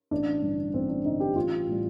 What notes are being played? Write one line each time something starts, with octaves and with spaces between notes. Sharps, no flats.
A1 D4
G2 D3
A1 C4
D4
G2 D3 D#4
G4
A1 F4
A2 G3